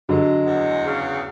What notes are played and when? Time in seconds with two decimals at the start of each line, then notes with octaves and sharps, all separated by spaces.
0.09 D3 F#3 G#3
0.46 E2
0.85 C#3